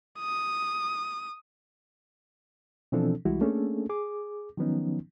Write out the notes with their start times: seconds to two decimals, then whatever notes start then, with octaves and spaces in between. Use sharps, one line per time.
0.20 D#6
2.92 B2 E3 F3 C4 D4 A4
3.25 C2 E3 G3 G#3 E4 F#4
3.41 A3 A#3 C#4 D4 G#4 A4
3.89 G#4 D6
4.57 D#3 F3 F#3 B3 C#4 D#4